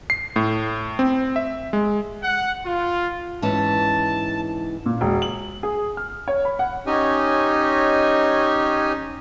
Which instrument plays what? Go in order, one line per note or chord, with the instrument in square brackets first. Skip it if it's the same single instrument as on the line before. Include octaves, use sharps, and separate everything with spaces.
[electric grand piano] C7
A2
C4
E5
G#3
[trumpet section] F#5
F4
[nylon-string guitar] G#2 E3 C#4 [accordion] A5
[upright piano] A#2
E1
F#7
G#4
F6
C#5
B5
F#5
[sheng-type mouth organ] C#4 D#4 G4 C#5 D#5 G#5